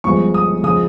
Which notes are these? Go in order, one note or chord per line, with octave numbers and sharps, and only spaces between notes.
G1 G2 F3 G#3 C#6
D#6
C#2 C#3 F3 G#3 D#6